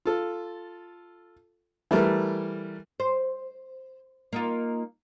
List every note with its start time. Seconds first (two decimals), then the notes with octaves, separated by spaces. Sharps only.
0.05 F4 A4
1.91 E3 G3 A3 A#4
3.00 C5
4.33 A#3 D#4 F4